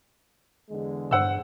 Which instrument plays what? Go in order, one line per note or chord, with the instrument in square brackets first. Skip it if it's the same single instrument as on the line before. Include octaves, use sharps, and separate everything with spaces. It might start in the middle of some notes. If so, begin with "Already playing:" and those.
[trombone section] E2 D3 G#3
[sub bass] G2 [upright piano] C5 F#5 E6